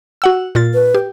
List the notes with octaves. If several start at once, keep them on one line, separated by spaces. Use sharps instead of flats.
F#4 F#5 E6
A#2 F4 A6
B4
G4